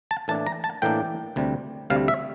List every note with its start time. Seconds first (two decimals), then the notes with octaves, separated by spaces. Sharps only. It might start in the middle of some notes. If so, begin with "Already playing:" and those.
0.11 A5
0.28 A2 E3 A#3 D4 A5
0.47 A#5
0.64 A5
0.82 A2 E3 A#3 D4 G5
1.36 D2 C3 G3
1.90 D2 C3 G3 F5
2.08 E5